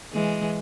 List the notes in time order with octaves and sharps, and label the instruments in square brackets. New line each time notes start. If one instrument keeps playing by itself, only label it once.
[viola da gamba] E3 G#3